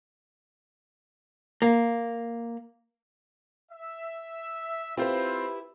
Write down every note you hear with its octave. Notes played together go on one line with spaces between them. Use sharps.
A#3
E5
C4 E4 F4 G4 B4 C5